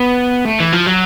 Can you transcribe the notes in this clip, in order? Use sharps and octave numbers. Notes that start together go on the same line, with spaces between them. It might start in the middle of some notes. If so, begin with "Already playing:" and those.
Already playing: B3
A3
E3
F3
F#3